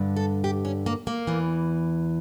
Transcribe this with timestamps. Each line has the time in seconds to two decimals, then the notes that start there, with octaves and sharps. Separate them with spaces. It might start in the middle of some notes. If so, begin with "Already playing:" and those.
Already playing: G2 D3
0.16 A4
0.44 G4
0.65 C#4
0.86 A#3
1.07 A#3
1.27 E2 E3